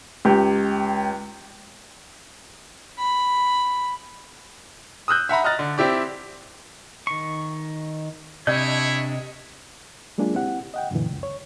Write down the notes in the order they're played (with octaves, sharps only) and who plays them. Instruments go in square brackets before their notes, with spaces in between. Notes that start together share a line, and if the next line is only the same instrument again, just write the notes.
[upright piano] C#2 G4
[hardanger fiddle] B5
[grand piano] D#6 E6 F#6 G6
E5 F#5 A#5 B5
D#5 A#5 F6 F#6 A6
D3
C4 E4 G4 D5
[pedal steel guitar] D#3 C#6
[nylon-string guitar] C3 [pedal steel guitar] D4 G6 [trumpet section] E4 C#5 [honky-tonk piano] D#5
[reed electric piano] F#3 G#3 A#3 D4 F4 G#4
C4 E4 G4 F#5
D#5 F#5 G5
F#2 A#2 D3 E3
C#2 F#2
C#5